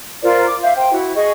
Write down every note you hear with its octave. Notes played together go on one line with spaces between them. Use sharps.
F4 A#4 C5 D5
D6
E5 F5 G6
C5 G5
E4 F#4
G#4 D#5 C#6